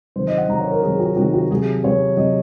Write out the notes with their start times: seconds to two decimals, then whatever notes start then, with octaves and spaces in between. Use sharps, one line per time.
0.16 C3 D#3 F#3 C5
0.27 D#5
0.38 F#5
0.49 C3 D#3 F#3 A#5
0.60 C#5
0.71 A#4
0.82 C3 D#3 F#3 G#4
1.00 F#4
1.16 C3 D#3 F#3 F#4
1.34 F#4
1.51 C3 F#3 G#4
1.84 C3 F#3 C#5
2.17 C3 F#3 D#5